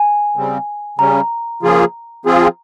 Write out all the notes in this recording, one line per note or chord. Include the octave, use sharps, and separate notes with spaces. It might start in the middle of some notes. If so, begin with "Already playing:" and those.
Already playing: G#5
C#3 G3 C4
C#3 G3 C#4 A#5
C#3 F3 A#3 F4 G#4
F3 C4 F4 G#4